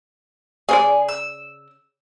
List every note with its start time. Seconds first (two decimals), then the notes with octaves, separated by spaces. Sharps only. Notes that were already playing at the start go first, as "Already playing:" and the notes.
0.69 C#3 G#4 C5 D5
1.09 E6